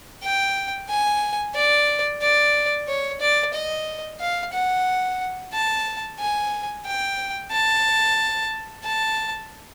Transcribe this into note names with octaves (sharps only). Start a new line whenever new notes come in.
G5
G#5
D5
D5
C#5
D5
D#5
F5
F#5
A5
G#5
G5
A5
A5